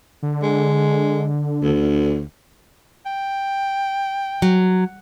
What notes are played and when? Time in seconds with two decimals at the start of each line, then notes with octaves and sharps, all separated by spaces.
0.23 D3
0.43 G#3
1.63 D2
3.06 G5
4.42 F#3